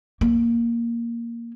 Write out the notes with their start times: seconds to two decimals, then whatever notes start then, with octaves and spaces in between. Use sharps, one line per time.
0.21 A#3